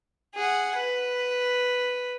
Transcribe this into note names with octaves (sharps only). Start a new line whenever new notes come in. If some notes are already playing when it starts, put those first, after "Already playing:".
G#4 F#5
B4